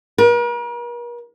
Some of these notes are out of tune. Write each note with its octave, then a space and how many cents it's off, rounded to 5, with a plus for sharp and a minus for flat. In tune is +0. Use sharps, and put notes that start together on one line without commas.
A#4 +45